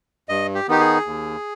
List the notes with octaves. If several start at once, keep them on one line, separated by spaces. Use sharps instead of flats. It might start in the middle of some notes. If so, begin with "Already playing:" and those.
G2 D#5
G4
D#3 B3 D#4 G4
G#4
D#2